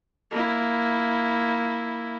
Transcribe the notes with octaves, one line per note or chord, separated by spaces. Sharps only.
A#3 E4